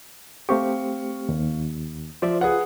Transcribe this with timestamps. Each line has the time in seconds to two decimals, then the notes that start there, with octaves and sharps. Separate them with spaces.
0.49 A3 C4 G4 F5 C#6
1.29 D#2
2.22 F3 C5 D5 E5
2.41 F4 G#4 B4 F#5